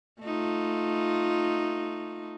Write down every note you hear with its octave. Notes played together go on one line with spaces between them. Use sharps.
A3 D#4 F4